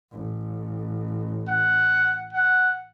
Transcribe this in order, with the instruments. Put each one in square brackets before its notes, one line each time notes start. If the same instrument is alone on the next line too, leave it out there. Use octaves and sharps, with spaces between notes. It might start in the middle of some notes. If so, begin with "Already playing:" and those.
[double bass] A1
[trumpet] F#5
F#5